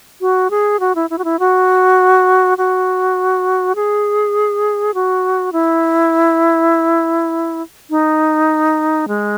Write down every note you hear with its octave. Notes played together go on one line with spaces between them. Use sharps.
F#4
G#4
F#4
E4
E4
F#4
E4
F#4
F#4
G#4
F#4
E4
D#4
G#3